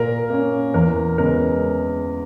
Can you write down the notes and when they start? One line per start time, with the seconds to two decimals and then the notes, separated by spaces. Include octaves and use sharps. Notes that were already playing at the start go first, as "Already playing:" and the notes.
Already playing: A#2 A#4
0.30 A#3 C#4
0.74 E2 A#4
1.18 C#3 G#3 B3 A#4